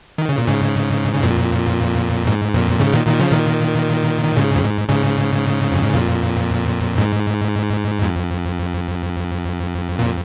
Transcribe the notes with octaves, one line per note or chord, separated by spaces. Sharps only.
D#3
C#3
A#2
G#2 C#3
C#3
F2 A#2
G#2
F2 A#2
G#2 C#3
A#2 D#3
A#2 D#3
C#3 F3
A#2 D#3
D#3
G#2 C#3
F2
G#2
G#2 C#3
F2
G#2
F2 A#2
G#2
F2
A#2